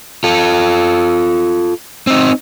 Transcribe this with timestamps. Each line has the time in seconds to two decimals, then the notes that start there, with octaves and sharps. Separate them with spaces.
0.24 F4 A4
2.07 C4 D#4